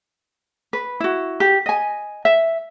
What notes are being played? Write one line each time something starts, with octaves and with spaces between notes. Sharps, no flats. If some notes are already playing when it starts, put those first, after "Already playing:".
B4
E4 F#4
G4
D#5 G#5
E5